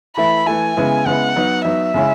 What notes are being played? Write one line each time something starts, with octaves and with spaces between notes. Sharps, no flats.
E3 A3 E4 B5
E3 A3 E4 G#5
C#3 G#3 B3 E4
C#3 G#3 B3 E4 F#5
F#3 B3 D#4
F#3 B3 D#4 E5
C#3 G#3 C#4 E4